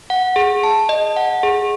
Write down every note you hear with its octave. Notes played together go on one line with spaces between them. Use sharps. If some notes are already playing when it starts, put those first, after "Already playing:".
F#5
G#4
A5
D#5
F#5
G#4